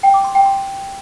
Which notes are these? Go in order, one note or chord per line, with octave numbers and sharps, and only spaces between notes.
G5
D6
C6
G5
C6